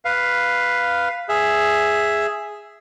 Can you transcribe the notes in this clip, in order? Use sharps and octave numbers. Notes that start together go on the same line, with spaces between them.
B4 F5
G#4 E5